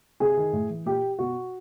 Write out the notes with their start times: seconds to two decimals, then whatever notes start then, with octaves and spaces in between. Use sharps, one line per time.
0.20 C3 G#4
0.37 D#3
0.53 A2
0.70 E3
0.86 A#2 G4
1.19 B2 F#4